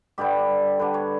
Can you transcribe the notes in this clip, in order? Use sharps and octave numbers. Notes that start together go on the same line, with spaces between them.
G2 D3 G3 G4
D3 G3 D4 B4
C#5